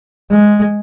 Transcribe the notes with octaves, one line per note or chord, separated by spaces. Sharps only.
G#3